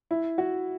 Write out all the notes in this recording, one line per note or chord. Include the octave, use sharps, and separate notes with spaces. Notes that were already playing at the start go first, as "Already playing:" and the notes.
E4
F#4